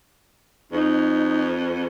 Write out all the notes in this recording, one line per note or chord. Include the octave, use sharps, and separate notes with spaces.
F2 D#4